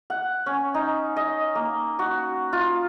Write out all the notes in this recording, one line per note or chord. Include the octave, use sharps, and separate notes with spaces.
F#5
C#4
D#4
D#5
A#3
F#4
F4